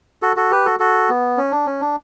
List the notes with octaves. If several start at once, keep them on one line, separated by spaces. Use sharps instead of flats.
F#4 A4
F#4 A4
G4 B4
F#4 A4
F#4 A4
B3
C#4
D4
C#4
D4